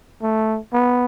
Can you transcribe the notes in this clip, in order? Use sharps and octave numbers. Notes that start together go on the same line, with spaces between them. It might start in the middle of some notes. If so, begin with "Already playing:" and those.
A3
B3